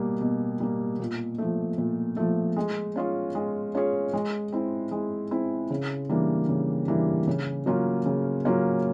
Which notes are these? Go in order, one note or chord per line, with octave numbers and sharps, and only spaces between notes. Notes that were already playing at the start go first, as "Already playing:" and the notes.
Already playing: B2 G3 A#3
B2
G3 A#3
A#2
F3 A3
A#2
F3 A3
G#3
C#4 F4 G#4 C#5
G#3
C#4 F4 G#4 C#5
G#3
C4 E4
G#3
C4 E4
C#3
E3 G3 A#3 D4
C#3
E3 G3 A#3 D4
C#3
F#3 A#3 C#4 F4
C#3
F#3 A#3 C#4 F4